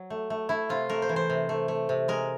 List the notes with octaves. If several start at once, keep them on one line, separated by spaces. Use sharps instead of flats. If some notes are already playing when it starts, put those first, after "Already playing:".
Already playing: F#3
A3
A3
A3 E4
C3 F4
A3 A#4
C5
E3
C5
C3
A3
A3
C3
G#3 A#4